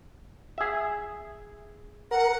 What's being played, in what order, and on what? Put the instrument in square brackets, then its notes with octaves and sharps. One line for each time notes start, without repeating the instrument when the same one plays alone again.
[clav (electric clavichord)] G#4 E5
[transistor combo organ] A#4 [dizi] F#5